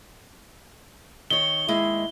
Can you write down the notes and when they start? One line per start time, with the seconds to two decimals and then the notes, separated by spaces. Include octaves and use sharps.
1.30 D#3 C#5 G7
1.68 D#2 G#3 E4